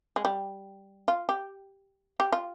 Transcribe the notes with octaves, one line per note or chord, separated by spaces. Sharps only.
G#3
G3
F4
G4
G4
F4